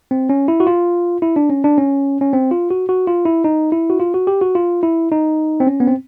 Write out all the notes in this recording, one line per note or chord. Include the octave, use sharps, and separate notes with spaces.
C4
C#4
E4
F#4
F4
E4
D4
C#4
D4
C#4
C#4
C4
F4
F#4
F#4
F4
E4
D#4
E4
F#4
F4
F#4
G4
F#4
F4
E4
D#4
C4
C#4
B3
C4